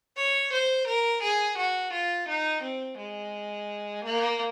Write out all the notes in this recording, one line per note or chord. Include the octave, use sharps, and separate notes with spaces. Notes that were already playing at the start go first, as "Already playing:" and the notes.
C#5
C5
A#4
G#4
F#4
F4
D#4
C4
G#3
A#3